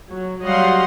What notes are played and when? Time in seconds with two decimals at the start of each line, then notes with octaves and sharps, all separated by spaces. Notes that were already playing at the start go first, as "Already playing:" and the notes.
0.12 F#3
0.42 F#3 G3 D#5 F5 F#5 C6